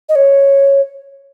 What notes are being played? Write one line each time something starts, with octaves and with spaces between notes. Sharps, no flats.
D#5
C#5